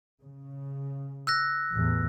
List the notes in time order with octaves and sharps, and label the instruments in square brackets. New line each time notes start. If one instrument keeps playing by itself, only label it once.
[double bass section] C#3
[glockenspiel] E6 F#6 A#6
[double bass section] A1 E2